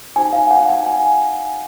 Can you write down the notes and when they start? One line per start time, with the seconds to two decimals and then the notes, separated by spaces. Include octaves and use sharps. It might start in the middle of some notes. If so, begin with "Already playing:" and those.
0.16 D#4 F#4 C5 G#5
0.33 F5
0.51 F#5
0.69 G#5
0.87 G#5